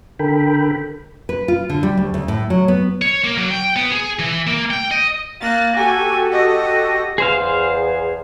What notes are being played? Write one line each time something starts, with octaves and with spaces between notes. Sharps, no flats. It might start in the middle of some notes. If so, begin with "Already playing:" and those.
D3 A4 A#4 G5 B5
B4
F4
D3
G3
D2
D2
A2
F#3
B3
C#5
A#3
F#3
G5
B3
G#4
E3
A#3
G5
D#5
A#3 F#6 A6
F#4 G4 A4 G#5
D#5
E2 G#4 C5 F5